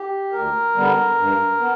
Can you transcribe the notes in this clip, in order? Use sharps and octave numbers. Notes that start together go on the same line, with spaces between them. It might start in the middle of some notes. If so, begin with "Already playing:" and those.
Already playing: G4
D2 A#4
D3 G3 B3
G2
B3